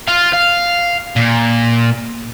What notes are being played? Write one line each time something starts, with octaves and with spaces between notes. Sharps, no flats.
F4 F5
F5
A#2